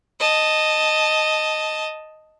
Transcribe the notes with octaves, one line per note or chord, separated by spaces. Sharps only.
D#5 A5